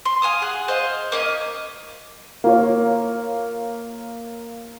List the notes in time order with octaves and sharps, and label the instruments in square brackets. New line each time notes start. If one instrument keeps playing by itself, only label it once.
[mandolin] C6
F5 G#5 A5 D#6
G#4 F#5
C5 D#5 F5
A#3 C#4 D#5
[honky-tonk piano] A#3 F4 C#5